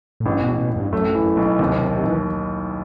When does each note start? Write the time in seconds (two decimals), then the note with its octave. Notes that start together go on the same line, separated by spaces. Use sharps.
0.20 A2
0.25 A1 G2
0.42 B2
0.48 A1
0.59 B2
0.70 A1
0.76 G2
0.93 F#2 A3
1.10 F#2
1.15 E3
1.26 F#2
1.37 B1
1.59 D#2 C3
1.82 D#3
2.04 D#2 E3